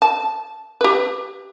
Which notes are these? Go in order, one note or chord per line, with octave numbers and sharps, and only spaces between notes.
A5
G4 B4